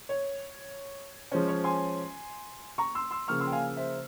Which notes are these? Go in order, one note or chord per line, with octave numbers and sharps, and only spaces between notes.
C#5
F3 G#3 C#4 C5
C#5
G#5 C6
A#5 C#6
C6 E6
C6 E6
C#3 F3 A#3 C#6 F6
C6 E6
G5
F5 G#5
C5 E5